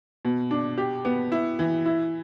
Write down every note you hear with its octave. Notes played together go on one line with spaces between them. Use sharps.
B2
D4
G4
B3
E4
E3
E4